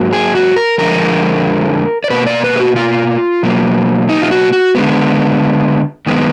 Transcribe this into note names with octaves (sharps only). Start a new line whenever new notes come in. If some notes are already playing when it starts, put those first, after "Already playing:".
Already playing: G#2 F#3 A#3
G#4
F#4
A#4
F2 D3 F3 G#3 A#4
D5
B2 A#3 B4
D5
B4
G#4
F#4
F4
B2 F#3 A#3
D#4
F4
F#4
F#4
D3 G#3 B3
F#2 D#3 G#3 B3